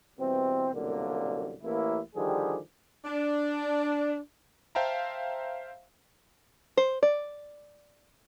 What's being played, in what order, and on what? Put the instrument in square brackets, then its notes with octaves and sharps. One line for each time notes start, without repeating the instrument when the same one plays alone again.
[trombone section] B2 E3 G3 C4
C2 F#2 B2 D3 A#3
A1 A#3 E4
D3 D#3 F3 G3 G4 G#4
[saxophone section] D4
[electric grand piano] C5 E5 F5 G5 A5 A#5
[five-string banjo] C5
D5